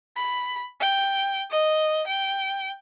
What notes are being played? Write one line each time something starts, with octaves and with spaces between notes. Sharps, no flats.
B5
G5
D#5
G5